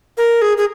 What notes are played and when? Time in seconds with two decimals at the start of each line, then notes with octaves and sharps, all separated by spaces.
0.18 A#4
0.42 G#4
0.58 G#4